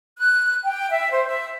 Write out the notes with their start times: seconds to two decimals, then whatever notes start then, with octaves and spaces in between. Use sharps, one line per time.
0.18 F#6
0.65 G5
0.91 E5
1.12 C5
1.28 E5